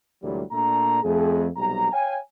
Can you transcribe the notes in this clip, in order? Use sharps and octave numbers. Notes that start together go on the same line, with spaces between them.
D2 A#2 E3 F#3 G3
A#2 A3 D4 A#5
F2 A3 G#4
B1 C3 G3 A#5
C#5 F5 G5 G#5